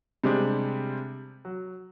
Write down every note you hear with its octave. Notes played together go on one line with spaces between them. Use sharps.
C3 G3 G#3 C4 D4
F#3